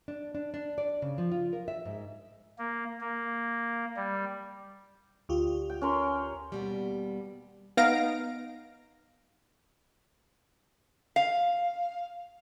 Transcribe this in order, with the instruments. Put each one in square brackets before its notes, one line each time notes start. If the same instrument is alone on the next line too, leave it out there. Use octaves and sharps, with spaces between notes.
[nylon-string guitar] D4
D4
D4
D5
C#3
F3
F4
A#4
E5
G#2
[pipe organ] A#3
A#3
G3
[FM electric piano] D2 F4 G4
[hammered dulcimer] G5
C#4 A#4 C6
[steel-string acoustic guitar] D#2 B2 G3
[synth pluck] B3 D#4 F5 A#6 D7
[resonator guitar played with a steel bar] F5